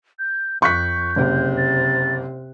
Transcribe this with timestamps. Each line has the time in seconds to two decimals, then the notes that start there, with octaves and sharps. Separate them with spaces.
0.19 G6
0.62 F2 C#6 F#6 G6 B6
1.16 F#1 C3
1.57 A6